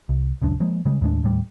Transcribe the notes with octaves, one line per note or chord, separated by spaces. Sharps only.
C2
D#1 C#2 F#2 D4
F3 G#3 A#3
C#3 G3 G#3
D#2 A2 G#3 D4
D#2 A2 G3